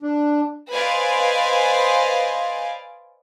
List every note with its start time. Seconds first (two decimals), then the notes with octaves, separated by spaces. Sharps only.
0.03 D4
0.73 B4 C5 D5 D#5 F5 G#5